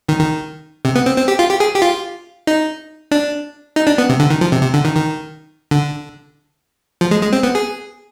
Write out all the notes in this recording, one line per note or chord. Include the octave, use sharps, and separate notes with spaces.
D#3
D#3
C3
B3
C4
C4
G4
F4
G4
G#4
G4
F4
D#4
D4
D#4
D4
B3
C3
D3
D#3
F3
C3
C3
D3
D#3
D#3
D3
F3
G#3
G#3
C4
B3
G#4